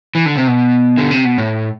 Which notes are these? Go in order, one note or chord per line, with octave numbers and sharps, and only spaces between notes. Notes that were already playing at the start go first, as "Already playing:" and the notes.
E3
D3
C3
B2
D3
C3
B2
A2